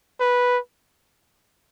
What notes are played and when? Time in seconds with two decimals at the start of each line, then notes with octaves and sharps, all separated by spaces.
0.20 B4